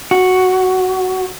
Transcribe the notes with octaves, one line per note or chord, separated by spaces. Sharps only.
F#4